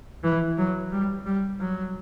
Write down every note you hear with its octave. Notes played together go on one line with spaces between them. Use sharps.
E3
F#3
G3
G3
F#3